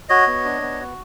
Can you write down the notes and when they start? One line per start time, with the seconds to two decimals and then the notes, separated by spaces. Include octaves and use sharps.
0.09 F#4 C#5 D#5
0.27 B3
0.45 D4
0.62 B3
0.80 F#4